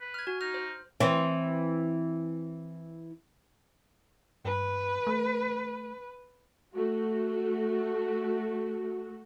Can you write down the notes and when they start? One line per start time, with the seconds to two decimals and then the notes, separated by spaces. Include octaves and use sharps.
0.01 B4
0.14 F6 G#6
0.27 F#4 G#5
0.41 D#4 F6
0.54 C5
1.00 E3 C4
4.45 G2 B4
5.07 A3
6.74 A3 F#4